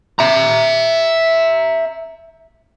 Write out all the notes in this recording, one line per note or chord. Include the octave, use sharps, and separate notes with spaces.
E5 A#5